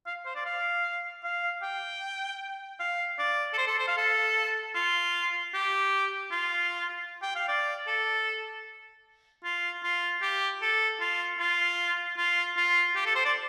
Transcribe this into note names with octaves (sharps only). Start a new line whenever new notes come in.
F5
C5
D5
F5
F5
G5
F5
D5
A4
C5
A4
C5
F5
A4
F4
G4
F4
G5
F5
D5
A4
F4
F4
G4
A4
F4
F4
F4
F4
G4
A4
C5
D5